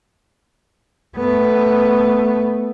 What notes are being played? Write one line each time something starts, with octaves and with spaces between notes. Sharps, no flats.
A3 B3